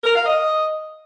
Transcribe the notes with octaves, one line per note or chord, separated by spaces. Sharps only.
A#4
F5
D#5